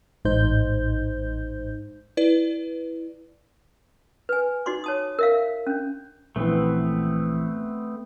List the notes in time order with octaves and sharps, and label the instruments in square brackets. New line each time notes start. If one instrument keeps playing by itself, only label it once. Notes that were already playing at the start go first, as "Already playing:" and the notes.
[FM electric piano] A1 G#2 D#4 C5 G6
[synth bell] E4 B4 D5
[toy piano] B4 G#5
D#4 F#4 D5 C6 D6
C#5 A5 D#6
A5
A#4 E5 F5
C#4 D4
[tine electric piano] A#1 E3 [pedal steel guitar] A3 B3 C4